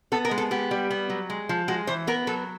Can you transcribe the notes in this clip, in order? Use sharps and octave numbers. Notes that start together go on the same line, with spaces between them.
B3 A4
A#4
G#3
A4
B3 G4
G3
B3
F#3
G#3
F3
G#3 F#4
E3 C5
B3 A#4
F#3 A4